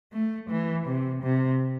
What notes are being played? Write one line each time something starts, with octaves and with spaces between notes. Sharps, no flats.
A3
E3
C3
C3